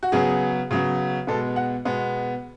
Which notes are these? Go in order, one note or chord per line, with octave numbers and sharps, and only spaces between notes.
F#4
C#3 F#3 B3 G#4
C#3 F#3 B3
B2 G#3 B3 A4
F#5
B2 G#3 B3